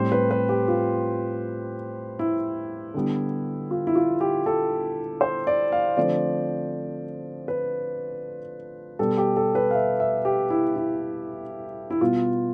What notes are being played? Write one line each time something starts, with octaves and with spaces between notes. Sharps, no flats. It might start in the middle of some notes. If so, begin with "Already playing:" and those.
Already playing: A2 G3 C4 C5
B4
B4
G4
F4
E4
D3 G3 B3
F4
E4
F4
G4
A4
C5
D5
F5
D3 F3 A3 C4 D5
B4
B2 G3 B3 A4
G4
A4
B4
F5
E5
E5
G4
E4
E4
E4
B2 G3 B3 F4